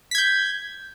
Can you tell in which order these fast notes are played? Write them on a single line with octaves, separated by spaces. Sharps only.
B6 G#6 G6